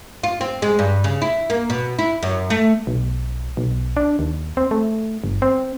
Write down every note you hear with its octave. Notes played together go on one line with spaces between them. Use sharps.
F4
C4
G#3
G2
C#3
E4
A#3
B2
E4
F#2
A3
B1
B1
D4
D#2
C4
A3
G1
C4